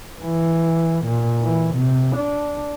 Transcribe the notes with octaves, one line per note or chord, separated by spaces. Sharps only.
E3
A#2
E3
C3
D4